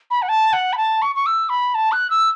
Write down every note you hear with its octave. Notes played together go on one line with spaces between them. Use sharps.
B5
F#5
A5
F#5
B5
A5
C#6
C#6
E6
B5
A5
F#6
E6